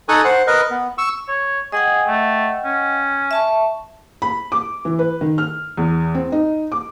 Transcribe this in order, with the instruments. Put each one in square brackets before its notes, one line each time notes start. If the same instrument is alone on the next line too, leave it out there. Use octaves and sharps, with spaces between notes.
[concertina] D#4 A4 G#5 C#6 D#6 F#6
C5 F#5
A#4 B4 D#5
B3
C#6 E6
[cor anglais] C#5
[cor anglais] G#4 [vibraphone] D#5 F#5 G5
[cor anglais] A3
C#4
[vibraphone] E5 A5 C#6
[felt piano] B5
D6
E3
B4
D#3
F6
E2
C4
D#4
D6